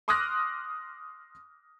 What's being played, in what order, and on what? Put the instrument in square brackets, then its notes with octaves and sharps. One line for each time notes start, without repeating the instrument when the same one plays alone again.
[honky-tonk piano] C6 D6 D#6 F6 F#6 A#6